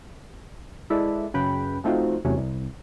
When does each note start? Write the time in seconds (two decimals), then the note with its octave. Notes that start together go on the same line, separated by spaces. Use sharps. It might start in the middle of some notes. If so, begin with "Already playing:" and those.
0.90 G#3 E4 A4 B4 D5 E5
1.34 F#2 C#3 B4 G5 B5
1.84 F3 A3 C4 D#4 F4 F#4
2.25 E2 C3 F#3 A3 C#4
2.37 C2